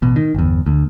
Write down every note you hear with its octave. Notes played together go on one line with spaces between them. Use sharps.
A1 B2
D#3
G1 E2
D2